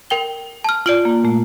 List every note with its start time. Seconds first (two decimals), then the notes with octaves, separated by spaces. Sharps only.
0.10 A#4 G5 G7
0.64 A5 F6
0.86 F4 D5 D7 F#7
1.05 A#3
1.24 A#2 A3